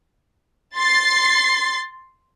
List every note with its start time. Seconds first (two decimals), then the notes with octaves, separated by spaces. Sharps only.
0.75 C6 A6 C7